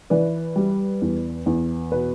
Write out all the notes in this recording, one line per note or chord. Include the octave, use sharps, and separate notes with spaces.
E3 B4 D5
G3
E2
E2
B2 B4